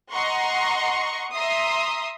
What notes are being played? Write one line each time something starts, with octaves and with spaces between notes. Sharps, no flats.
D#5 F#5 A#5 C6 C#6
E5 A#5 C6 D#6